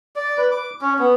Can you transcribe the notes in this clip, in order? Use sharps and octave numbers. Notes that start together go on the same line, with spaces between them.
D5
B4
D6
C#4
B3